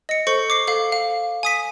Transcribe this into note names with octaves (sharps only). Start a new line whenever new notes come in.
D#5 C#7
A4 C5 C#6 C#7
D6 C7
A4 F5
F5
G#5 D#6 B6